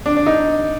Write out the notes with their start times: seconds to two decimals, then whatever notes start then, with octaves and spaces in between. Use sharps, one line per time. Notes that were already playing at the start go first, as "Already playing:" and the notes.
0.06 D4
0.17 D4
0.26 D#4